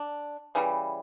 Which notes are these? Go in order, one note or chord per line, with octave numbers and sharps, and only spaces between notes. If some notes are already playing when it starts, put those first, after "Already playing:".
Already playing: D4
C#3 E3 G3